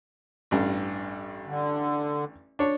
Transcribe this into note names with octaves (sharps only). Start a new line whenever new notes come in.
A1 G2
D3
D4 C#5